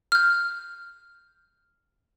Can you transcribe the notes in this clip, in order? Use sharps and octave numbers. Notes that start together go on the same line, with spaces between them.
F6 G6